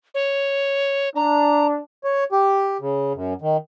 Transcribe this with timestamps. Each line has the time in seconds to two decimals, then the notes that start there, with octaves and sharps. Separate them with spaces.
0.14 C#5
1.16 D4 A#5
2.04 C#5
2.32 G4
2.81 C#3
3.15 F#2
3.42 D#3